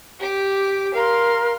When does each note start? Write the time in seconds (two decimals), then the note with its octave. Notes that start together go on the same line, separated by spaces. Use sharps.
0.20 G4 D6
0.94 A#4 F5 C6